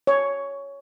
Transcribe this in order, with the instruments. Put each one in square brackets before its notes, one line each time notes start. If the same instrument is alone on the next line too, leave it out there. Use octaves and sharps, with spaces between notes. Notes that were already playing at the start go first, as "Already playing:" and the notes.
[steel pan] C#5